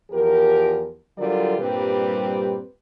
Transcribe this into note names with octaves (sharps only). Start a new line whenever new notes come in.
E2 F3 G4 A#4
D3 F#3 G3 F4 A#4 D5
G2 A#2 G3 C4 G4 B4